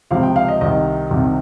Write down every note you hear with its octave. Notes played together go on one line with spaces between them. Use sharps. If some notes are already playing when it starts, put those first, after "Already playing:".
C#2 C3 F3 F5
G5
F5
D#5
C2 C3 D#3 D#5
C2 C3 D#3